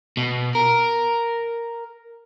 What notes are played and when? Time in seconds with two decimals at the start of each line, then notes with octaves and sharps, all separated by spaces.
0.17 B2
0.55 A#4